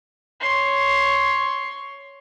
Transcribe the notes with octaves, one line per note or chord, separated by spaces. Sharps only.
C#5 C6